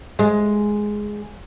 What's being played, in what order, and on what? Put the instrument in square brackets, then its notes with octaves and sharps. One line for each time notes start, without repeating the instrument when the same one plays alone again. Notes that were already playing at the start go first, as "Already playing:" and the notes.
[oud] G#3